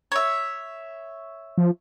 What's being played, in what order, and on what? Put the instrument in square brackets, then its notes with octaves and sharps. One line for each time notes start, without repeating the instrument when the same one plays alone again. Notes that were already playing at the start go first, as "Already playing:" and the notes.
[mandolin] C#5 E5
[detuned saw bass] F3